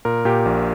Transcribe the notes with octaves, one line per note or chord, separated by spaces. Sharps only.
A#2 A#4
A#2 G4
A#1